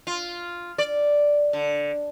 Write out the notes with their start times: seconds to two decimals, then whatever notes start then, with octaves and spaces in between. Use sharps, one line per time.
0.07 F4
0.78 D5
1.53 D3